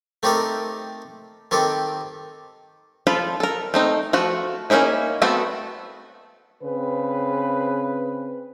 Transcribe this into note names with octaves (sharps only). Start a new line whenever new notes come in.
A3 C4 D#4 G4 A4 A#4
D#3 C4 G4 A4
F3 F4 A4 B5
A4 A#4
A3 C4 D#4
F3 A3 F#4
A#3 C#4 D#4 E4 G#4
A3 B3 C4 F#4 A4
C#3 C4 B4